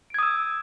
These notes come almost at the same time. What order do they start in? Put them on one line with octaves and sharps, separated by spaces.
D7 G#6 D#6 E6